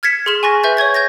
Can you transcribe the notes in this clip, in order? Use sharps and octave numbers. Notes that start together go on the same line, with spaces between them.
F6 G#6 A6 B6 C#7 E7
G#4 C6 F6 E7
G#5 C6 C#6 F#6 A6 A#6
B4 E5 G6 A6
C#5 C#6 G#6 A6
G6 A6 A#6